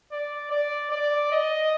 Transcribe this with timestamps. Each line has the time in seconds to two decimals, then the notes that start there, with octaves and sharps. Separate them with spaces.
0.12 D5
0.51 D5
0.92 D5
1.32 D#5